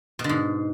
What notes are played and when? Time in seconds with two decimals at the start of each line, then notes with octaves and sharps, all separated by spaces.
0.19 B2
0.24 D3
0.29 G#2